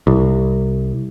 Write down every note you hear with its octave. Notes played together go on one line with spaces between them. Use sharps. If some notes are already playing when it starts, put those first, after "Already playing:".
C2